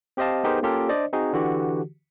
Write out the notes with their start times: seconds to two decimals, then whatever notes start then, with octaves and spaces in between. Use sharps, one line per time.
0.17 C4 G4 C5 D#5 F5 A5
0.44 B3 D#4 G4 G#4 A#4 C5
0.63 A#3 C#4 F4 G4 A4 A#4
0.89 D4 C5 D5 D#5
1.13 C4 D#4 F#4 G#4
1.33 D3 E3 F#4 G4